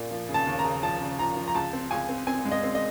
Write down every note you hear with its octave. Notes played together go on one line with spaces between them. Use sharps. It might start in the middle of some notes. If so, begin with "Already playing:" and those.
Already playing: A#2
F3
C#3
A5
D#2
A#5
C#3
F3 A5
C#3
F3 A#5
F3
A#5
C#2 A5
C4
C#2 G#5
C4
C4 G#5
G#3
D#5
C4
D#5